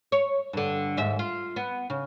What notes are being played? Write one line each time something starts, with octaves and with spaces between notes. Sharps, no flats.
C#5
G2 D3
D#2 G#2 E5
F4
B3
C#3